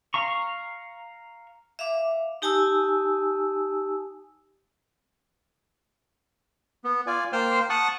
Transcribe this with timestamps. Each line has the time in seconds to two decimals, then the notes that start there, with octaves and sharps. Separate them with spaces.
0.14 F5 A#5 C#6
1.79 E5 F5 D6
2.42 D#4 G4 G#5 A5 D#6 E6
6.84 B3
7.07 F4 D5 G#5
7.33 A#3 C5 G5 C6 F6
7.70 F#5 A5 C#6 D#6 F#6